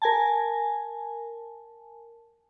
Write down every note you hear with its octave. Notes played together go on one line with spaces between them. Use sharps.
A#4 G#5 A5